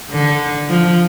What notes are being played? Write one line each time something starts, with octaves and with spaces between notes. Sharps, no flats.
D3
F3